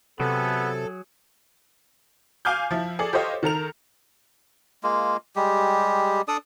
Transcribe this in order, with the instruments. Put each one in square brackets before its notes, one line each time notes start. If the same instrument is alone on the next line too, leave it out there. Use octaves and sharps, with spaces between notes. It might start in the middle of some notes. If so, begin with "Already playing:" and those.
[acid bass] C3 [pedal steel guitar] F#3 G#4 [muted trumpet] B3 [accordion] A4
[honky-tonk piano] F5 G#5 D6 F6 G6
F3 E4
G#4 A4 D5
G4 A4 C5 C#5 D#5 F5
D#3 A4 A#4 F7
[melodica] G#3 A#3 F4
G3 G#3 G4
D4 A4 D5 D#6